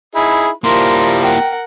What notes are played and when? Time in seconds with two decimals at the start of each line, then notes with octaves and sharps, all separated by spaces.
0.15 D#4 E4 G#4 B5
0.64 F3 G3 A#3 E4 A#4 C6
1.23 A#4 F#5 G5